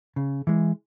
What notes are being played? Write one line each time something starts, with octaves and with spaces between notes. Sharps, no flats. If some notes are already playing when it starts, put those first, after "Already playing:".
C#3
E3 G#3